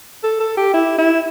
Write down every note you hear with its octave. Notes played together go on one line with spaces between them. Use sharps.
A4
A4
G4
E4
E4